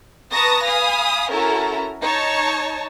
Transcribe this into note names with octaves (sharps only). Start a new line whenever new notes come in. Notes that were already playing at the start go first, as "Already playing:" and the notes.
B4 A5 A#5 C#6 D#6 A#6
F5 G#5 B5 D#6
C#4 E4 F#4 A4 A#4 A#5
D#4 C#5 A5